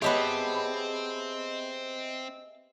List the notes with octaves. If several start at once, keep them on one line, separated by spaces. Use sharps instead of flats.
B3 C4 G4 G#4 C#5 D#5 E5 A5